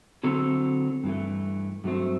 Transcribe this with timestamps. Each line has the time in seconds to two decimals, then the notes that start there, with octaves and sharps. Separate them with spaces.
0.23 D3 F#3 C4 E4 A4
1.04 G2 E3 A3
1.84 G2 F#3 A3 C4